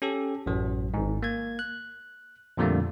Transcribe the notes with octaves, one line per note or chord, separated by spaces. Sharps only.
C#4 G4 A4
A1 F#2 F#3
G#1 G#2
A#3 G#6
F#6
F2 A#2 D3 G3 A3 A#3